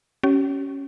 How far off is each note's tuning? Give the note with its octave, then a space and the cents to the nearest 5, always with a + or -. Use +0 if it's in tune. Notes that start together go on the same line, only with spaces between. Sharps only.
C#4 +0 G4 -40